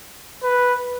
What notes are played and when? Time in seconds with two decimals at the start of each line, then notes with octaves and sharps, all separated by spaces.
0.43 B4